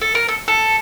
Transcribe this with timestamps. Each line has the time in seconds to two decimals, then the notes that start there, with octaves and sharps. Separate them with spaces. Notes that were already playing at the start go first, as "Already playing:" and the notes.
0.01 A4
0.15 A#4
0.28 A4
0.48 A4